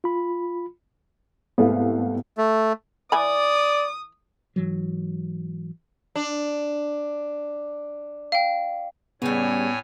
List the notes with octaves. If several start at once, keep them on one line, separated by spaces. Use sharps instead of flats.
F4 B5
C2 G#2 A3 B3 F5
A3
E3 D5 G#5 B5 D#6
G#2 E3 F#3
D4
F5 G5
A2 C#3 G3 B3 C#5 G#5